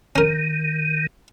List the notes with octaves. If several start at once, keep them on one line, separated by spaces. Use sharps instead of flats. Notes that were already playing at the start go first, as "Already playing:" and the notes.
D#3 C#4 A#4